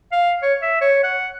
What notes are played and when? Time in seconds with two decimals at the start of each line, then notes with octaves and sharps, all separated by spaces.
0.12 F5
0.42 C#5
0.62 E5
0.81 C#5
1.03 F#5